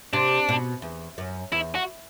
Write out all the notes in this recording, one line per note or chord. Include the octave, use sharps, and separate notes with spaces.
C3 D4
B2
E2
F#2
E2 E4
F#4